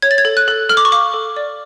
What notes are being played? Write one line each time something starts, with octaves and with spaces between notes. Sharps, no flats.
C#5 G#6
A6
G#6
A4
F#6
A4
A4 F6
D6
C#6
F5 D6
A4
D5